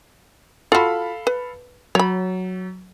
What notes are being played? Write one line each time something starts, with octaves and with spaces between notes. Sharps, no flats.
F4 F#4 A4 F5 B5
B4
F#3 C#5 B5